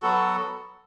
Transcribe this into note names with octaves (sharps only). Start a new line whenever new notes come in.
F#3 B3 F#4 A4